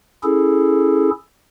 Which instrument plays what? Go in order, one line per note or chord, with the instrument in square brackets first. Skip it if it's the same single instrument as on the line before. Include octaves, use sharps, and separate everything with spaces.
[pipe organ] C#4 E4 G#4 A4